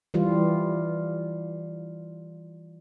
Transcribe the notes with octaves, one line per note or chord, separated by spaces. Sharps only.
E3 G3 F4